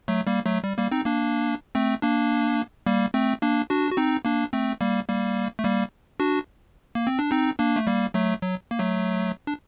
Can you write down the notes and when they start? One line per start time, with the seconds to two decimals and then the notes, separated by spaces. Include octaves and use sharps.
0.08 F#3 A3
0.27 G3 A#3
0.46 F#3 A3
0.64 G3
0.78 G3 A#3
0.91 C4 D#4
1.05 A#3 D4
1.75 A3 C4
2.02 A#3 D4
2.86 G3 A#3
3.14 A3 C4
3.42 A#3 D4
3.70 D4 F#4
3.91 F#4
3.97 C4 D#4
4.25 A#3 D4
4.53 A3 C4
4.81 G3 A#3
5.08 G3 A#3
5.59 A3
5.64 G3 A#3
6.20 D4 F#4
6.95 A#3
7.07 C4
7.19 D4
7.31 C4 D#4
7.59 A#3 D4
7.76 A3
7.87 G3 A#3
8.14 F#3 A3
8.42 F#3
8.71 A#3
8.79 F#3 A3
9.47 D4